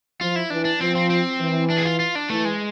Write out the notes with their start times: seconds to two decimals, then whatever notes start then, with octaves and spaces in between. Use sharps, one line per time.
0.21 F3 F4
0.36 E4
0.50 E3 D4
0.65 D4
0.80 F3 C4
0.95 C4
1.10 C4
1.40 E3
1.70 D4
1.78 G#4
1.85 F4
2.00 F4
2.15 D4
2.30 E3 A3
2.45 G#3